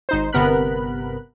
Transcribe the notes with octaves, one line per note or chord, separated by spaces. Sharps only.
G#1 D#4 C5
G1 C3 B3 A#4 B5 F#6